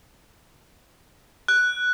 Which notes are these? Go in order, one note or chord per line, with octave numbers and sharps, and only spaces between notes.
F#6